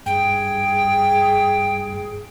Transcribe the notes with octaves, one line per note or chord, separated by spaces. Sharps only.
G2 G#4 G5